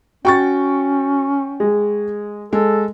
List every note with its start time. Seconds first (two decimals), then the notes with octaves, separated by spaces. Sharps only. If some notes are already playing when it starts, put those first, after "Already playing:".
0.25 C#4 F#4 G5 C#6 A6
1.60 G#3
2.53 G#3 A4